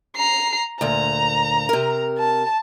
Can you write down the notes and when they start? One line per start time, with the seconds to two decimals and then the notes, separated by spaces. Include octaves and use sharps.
0.17 A#5 C7
0.81 D2 A#2 A#5
1.69 C3 A#4
2.19 A5